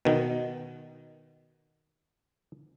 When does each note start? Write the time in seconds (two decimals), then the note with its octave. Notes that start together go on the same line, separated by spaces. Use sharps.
0.05 B2 D#3